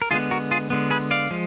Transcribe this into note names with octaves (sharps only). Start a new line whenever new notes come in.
A#4
D3 G#3 B3 F4 G#4
F#4 A#4
F4 G#4
D3 G#3 B3
G#4 B4
D5 F5
F3 G#3